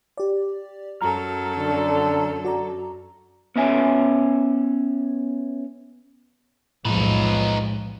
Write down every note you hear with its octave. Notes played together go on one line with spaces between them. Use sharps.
G4 D5
F#2 F#3 A4 A#5 F6
D3
F#4 D5 A#5
B3 C#4 E5 G#5
B1 E2 A2 F3 G#3 D#4 B4